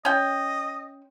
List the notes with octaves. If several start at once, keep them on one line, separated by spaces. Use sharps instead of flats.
C#4 D#5 G5